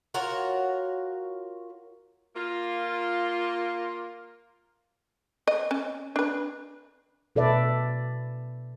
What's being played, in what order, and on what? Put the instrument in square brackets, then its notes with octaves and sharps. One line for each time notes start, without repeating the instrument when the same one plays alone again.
[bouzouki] F4 F#4 A#4 C#5
[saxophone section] A#3 F4
[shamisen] D#5
C#4
D4 B4
[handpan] B2 A4 B4 D5 E5